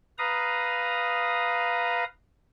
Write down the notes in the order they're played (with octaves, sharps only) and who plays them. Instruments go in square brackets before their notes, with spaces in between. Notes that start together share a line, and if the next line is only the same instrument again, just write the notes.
[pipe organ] B4 F5 A#5 D#6